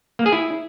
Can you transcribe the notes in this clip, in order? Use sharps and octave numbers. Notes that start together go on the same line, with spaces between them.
A#3
G#4
E4